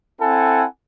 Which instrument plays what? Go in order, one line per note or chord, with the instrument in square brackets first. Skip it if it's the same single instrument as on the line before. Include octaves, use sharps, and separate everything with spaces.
[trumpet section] C4 E4 A4 F#5 G#5